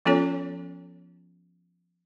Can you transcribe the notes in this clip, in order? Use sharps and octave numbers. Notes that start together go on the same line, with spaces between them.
F3 B3 C#4 F4 A4 C#5